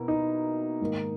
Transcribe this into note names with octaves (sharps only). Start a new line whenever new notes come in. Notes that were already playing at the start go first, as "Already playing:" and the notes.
Already playing: B2 A#3 E4
D#4
G#2 D#3 A#3